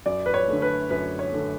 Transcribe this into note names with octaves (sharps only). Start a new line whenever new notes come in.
F#2 D5
B4
C#5
D3 A3
B4
F#2 B4
C#5
D3 A3